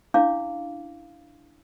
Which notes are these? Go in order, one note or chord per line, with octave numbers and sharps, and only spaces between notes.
C#4 D4 E4 F5 D6